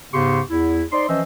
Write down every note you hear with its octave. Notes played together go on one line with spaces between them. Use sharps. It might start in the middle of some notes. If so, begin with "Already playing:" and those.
G#2 C#3 B3 G4 C6 C#6
E2 E4
D#4 C5 D5 C6
E3 F3 C#4 C5 D#5 E5